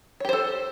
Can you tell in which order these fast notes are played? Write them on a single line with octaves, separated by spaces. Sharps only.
C#5 G4 C5 A4